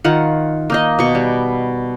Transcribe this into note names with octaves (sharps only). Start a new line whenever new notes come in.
D#3 F4 F#5
A#3 D#4 D#5
B2 C#6
G3